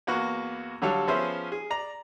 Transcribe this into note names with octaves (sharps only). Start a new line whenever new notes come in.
E2 A#3 B3 F#4 C#6
D3 F#3 G3 A4 C#5 F5
F3 B3 C#4 G#4 C5 E5
G#4
D5 A#5